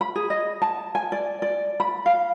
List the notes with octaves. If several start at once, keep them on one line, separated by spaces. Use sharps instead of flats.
B5
G#4
D#5
A5
G#5
D5
D5
B5
F5